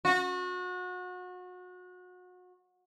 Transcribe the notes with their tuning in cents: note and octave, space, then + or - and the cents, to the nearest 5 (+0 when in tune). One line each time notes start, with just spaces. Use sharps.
F#4 -30